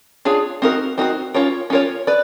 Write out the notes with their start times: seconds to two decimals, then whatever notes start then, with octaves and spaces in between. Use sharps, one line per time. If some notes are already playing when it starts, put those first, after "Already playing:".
0.25 D4 F4 G#4 C#5
0.62 C4 D#4 F#4 A#4
0.98 C4 D#4 F#4 A#4
1.34 C#4 F4 A#4 C#5
1.70 C#4 F4 A#4 C#5
2.07 B4 D5